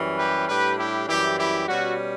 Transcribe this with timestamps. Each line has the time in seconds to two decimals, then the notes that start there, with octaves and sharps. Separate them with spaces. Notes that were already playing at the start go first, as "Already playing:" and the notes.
Already playing: F#2 E3 G3 C#4
0.18 G4 B4
0.49 A2 G3 D4 G4 B4
0.78 E4 G4
1.09 F#2 E3 G3 E4 G4
1.38 E4 G4
1.68 B2 G3 C#4 F#4